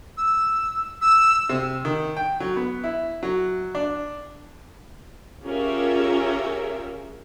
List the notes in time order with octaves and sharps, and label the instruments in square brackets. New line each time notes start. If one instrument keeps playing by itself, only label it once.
[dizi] E6
E6
[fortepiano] C3
D#3
G5
F#3
B3
E4
F#3
D4
[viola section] C#4 F4 G4 G#4 A#4 E5